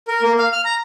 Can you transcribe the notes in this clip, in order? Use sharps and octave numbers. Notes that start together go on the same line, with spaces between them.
A#4
A#3
F5
F6
A#5